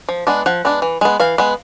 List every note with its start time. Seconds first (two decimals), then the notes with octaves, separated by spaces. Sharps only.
0.09 F3
0.27 G#3 B3 D4
0.46 F3 F#5
0.65 G#3 B3 D4
0.82 E3
1.01 G#3 B3
1.20 E3 F5
1.38 G#3 B3